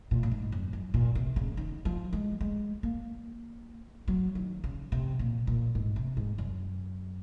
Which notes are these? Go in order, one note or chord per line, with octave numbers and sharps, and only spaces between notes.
A#2
A#2
G#2
F#2
F#2
A#2
C3
C#3
D#3
F3
G#3
G#3
A#3
F#3
D#3
C#3
C3
A#2
A#2
G#2
C3
G#2
F#2